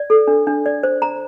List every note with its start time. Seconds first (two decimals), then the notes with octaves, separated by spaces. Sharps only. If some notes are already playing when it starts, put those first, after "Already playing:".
Already playing: D5
0.10 A4
0.27 D4
0.47 D4
0.66 D5
0.83 C5
1.02 A#5